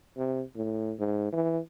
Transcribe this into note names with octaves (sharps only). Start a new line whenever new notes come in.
C3
A2
G#2
E3